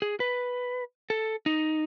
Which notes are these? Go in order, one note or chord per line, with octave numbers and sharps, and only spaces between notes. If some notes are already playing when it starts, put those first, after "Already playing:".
G#4
B4
A4
D#4